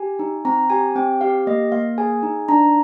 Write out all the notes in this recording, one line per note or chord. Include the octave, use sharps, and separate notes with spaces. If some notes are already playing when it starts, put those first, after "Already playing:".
Already playing: G4 G#5
D#4
C4 A#5
G4 G#5
C4 G5
G4 F5
A#3 D#5
A#3 F5
G#4 G#5
D#4
D4 A#5